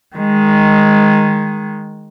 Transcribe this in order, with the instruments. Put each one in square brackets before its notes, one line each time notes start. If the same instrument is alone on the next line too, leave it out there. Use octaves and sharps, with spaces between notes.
[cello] D#3 G#3